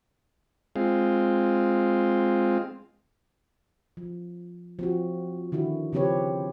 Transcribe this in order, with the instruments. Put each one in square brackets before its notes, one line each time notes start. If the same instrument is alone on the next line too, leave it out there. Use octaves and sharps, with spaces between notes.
[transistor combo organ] G#3 C4 F4
[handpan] F3
F3 C4 F#4
D3 D#3 E4 F#4
C#3 F3 C4 G4 B4 C#5